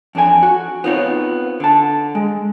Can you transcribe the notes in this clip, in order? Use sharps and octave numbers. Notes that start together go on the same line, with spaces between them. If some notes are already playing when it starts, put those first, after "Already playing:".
F2 D4 G#4 G#5
F#4
B3 C4 D#4 F4 B4 C#5
D3 A5
G#3